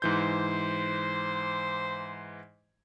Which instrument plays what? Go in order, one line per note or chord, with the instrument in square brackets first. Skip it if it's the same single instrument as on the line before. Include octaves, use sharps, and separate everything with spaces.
[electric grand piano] G#2 E3 G6 [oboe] C5